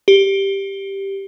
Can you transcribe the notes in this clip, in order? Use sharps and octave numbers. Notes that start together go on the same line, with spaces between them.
G4